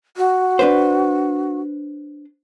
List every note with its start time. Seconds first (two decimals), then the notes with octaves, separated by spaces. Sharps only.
0.17 F#4
0.59 D4 B4 C5